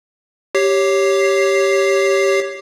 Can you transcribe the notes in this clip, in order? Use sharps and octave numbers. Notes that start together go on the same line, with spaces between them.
G4 C#5 C7